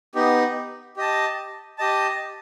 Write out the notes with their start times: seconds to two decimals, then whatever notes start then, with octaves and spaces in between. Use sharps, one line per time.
0.15 B3 D#4 G4
0.97 G4 D#5 A5
1.78 G4 D#5 A5